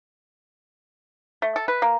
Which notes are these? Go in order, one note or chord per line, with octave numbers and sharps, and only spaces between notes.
A3
A4
B4
A#3